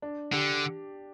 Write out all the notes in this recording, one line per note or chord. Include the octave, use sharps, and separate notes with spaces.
D4
D3 G4